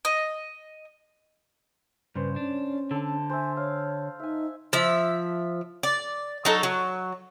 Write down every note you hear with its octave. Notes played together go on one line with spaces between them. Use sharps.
D#5
G2 C#3 B4 C5
C#4 D4
D3 A4 A5
C5 E5 G#5
C#5 F5
D#4 E5 G#5
F3 E5
D5
F#3 D#4 A4
F#3